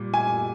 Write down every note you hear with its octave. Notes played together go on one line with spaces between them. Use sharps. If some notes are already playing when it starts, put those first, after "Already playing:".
Already playing: A#2 G3
G#5